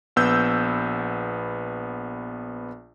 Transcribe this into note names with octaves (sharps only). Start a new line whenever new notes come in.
A#1 B3 E6 G6